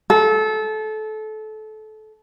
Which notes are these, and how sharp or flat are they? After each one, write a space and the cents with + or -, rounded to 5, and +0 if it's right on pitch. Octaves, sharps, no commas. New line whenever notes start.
A4 -25